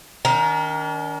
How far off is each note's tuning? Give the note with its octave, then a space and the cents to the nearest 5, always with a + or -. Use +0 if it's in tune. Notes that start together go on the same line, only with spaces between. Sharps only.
D#3 +0 D4 -45 A#5 +15